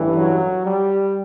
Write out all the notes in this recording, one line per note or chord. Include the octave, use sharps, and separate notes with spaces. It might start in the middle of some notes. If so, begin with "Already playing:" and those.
Already playing: A1 G2 E3
F#3
G3